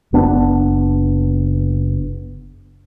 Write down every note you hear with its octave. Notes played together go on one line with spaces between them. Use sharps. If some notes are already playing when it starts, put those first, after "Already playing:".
F#1 B3 D4